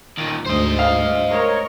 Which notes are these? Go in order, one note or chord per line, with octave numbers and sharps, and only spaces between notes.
D#2 A#2
D2 G#2 C5 D#5
F5
A#4 C#5